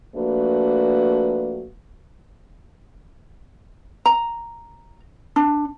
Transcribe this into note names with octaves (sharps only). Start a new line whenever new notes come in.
F3 A3 A#3 D4 F#4 B4
A#5
D4